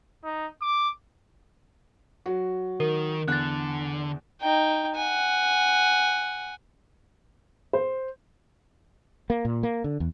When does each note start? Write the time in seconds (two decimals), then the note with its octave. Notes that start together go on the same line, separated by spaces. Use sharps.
0.24 D#4
0.62 D6
2.26 F#3 F#4
2.80 D#3 A#4
3.28 E2 D3 F#6 A6
4.41 D#4 G5
4.95 F#5 G#5
7.73 C5
9.30 A#3
9.45 A#2
9.63 A#3
9.84 D3
10.00 E2